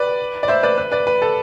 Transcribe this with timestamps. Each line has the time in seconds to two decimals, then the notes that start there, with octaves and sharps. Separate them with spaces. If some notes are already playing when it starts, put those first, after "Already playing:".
Already playing: B4 D5
0.43 D5
0.48 C5 E5
0.63 B4 D5
0.78 B4
0.92 B4 D5
1.07 B4
1.22 A4